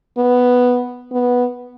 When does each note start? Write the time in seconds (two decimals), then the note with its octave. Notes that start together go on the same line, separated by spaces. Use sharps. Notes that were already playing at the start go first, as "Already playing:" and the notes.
0.18 B3
1.12 B3